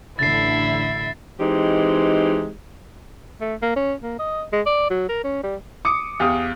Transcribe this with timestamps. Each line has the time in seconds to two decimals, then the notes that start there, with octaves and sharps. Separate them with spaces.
0.19 A1 D3 E4 E5 A6 C7
1.40 E3 G#3 C4 D#4 G4
3.41 A3
3.62 A#3
3.76 C#4
4.03 A#3
4.19 D#5
4.52 G#3
4.66 D5
4.90 F#3
5.09 A#4
5.24 C#4
5.43 G3
5.85 D6 D#6 C#7
6.20 E2 G4 F5 D#6